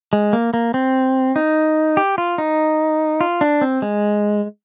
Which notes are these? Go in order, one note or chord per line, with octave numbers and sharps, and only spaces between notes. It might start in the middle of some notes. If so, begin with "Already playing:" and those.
G#3
A#3
A#3
C4
D#4
G4
F4
D#4
F4
D4
C4
G#3